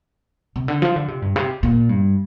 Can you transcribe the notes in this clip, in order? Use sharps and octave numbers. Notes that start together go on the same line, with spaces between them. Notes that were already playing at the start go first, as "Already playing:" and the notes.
C3
D3
F3
D3
C3
G2
C3
A#2
G2